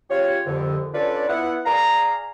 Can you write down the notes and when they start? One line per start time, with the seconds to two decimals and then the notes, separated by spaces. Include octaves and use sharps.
0.09 C#3 F4 G4 C#5
0.46 C2 F2 D3
0.94 C#4 D4 F4 A4 B4 D5
1.28 B3 E4 F#5
1.66 G#4 D5 F5 A#5